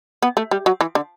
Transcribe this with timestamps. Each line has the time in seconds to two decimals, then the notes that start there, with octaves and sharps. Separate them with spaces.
0.22 B3
0.37 A3
0.51 G3
0.66 F#3
0.81 E3
0.95 D3